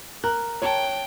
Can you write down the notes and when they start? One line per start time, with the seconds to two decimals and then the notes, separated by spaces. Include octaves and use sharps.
0.24 A#4 F#6
0.62 C#5 G5 A5